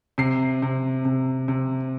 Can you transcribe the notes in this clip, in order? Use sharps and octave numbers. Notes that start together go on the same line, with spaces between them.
C3 C7
C3
C3
C3